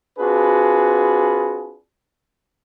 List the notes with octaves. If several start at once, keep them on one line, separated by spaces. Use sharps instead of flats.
C4 D4 F4 F#4 G#4 B4